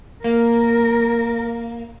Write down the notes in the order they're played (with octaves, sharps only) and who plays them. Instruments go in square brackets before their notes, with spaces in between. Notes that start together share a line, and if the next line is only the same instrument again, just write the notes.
[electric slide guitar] A#3 [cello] A#4